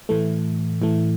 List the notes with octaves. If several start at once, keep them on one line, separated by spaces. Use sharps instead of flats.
A2 E3 A3
A2 E3 A3